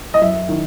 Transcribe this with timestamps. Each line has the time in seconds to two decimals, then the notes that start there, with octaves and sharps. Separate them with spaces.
0.14 D#5
0.21 F#2 E5
0.49 D#3